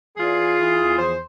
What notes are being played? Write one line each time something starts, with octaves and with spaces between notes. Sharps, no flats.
E2 F4 G#4
E3
E3
E2
F3 G#4 C5